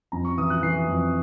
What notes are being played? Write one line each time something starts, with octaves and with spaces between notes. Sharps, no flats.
F2 A#5
C#6
E3 D#6
F#6
E3 C7
F2